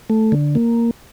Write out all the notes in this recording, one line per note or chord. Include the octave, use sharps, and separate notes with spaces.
A3
D3
A#3